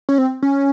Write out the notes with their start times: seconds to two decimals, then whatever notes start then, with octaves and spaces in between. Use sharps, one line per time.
0.09 C#4
0.18 C4
0.42 C#4